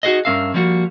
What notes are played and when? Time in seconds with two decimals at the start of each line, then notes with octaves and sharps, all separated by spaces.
0.03 D#4 F#4 G#4 C5 D#5
0.25 G2 C#4 A#4 E5 F5
0.54 F3 G3 A#3 F#4